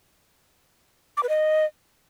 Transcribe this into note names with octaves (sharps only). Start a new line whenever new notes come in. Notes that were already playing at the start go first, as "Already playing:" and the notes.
D6
B4
D#5